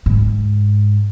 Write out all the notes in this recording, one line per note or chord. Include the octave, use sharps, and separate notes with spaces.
G#2